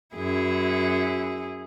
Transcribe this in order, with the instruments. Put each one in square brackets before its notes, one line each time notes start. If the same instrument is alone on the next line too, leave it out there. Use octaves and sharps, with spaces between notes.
[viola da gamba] F#2 E4 G#4